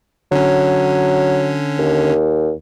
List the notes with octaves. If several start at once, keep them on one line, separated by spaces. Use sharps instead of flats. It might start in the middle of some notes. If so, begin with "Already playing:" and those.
D3 F#3 C#4
D#2